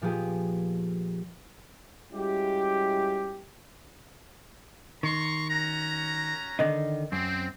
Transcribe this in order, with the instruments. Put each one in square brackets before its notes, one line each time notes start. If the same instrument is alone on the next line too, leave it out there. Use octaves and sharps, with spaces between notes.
[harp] A#2 F3 B3 G4 G#4
[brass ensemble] G3 G#3 C#4 E4 F#4 G4
[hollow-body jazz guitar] D#3 [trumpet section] A#5 C6 C#6
[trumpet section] C#4 F#4 A#5
[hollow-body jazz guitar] D3 D#3 D#4
[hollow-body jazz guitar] F#2 [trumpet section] C4